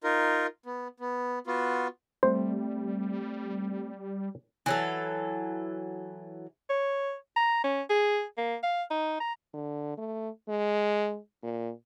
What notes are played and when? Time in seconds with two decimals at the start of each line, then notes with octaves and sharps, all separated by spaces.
0.04 D#4 F4 A#4
0.66 B3
1.00 B3
1.47 B3 F4 F#4
2.23 G3 A3 C4 C5
4.66 E3 F#3 A4
6.70 C#5
7.36 A#5
7.64 C#4
7.90 G#4
8.38 A#3
8.63 F5
8.90 D#4
9.20 A#5
9.54 D3
9.98 A3
10.49 G#3
11.43 A#2